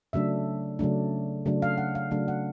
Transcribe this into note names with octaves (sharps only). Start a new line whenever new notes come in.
C#3 F#3 A3 D4 E5
C#3 F#3 A3 D4
C#3 F#3 A3 D4
F5
F#5
F5
C#3 F#3 A3 D4
F#5